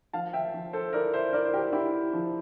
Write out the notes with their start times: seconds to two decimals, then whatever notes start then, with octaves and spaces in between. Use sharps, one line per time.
0.13 F3 F5 A5
0.33 E5 G5
0.54 F3
0.73 A4 C5
0.93 E4 A#4 D5
1.14 C5 E5
1.33 E4 A#4 D5
1.45 C5
1.53 G4 A#4
1.72 E4 G4
2.13 F3